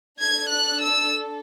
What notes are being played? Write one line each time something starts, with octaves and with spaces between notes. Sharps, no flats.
D4 A4 G#6
F#6
E6